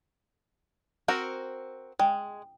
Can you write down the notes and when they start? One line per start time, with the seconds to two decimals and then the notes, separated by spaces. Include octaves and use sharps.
1.08 C4 F#4 A#4
1.99 G#3 G5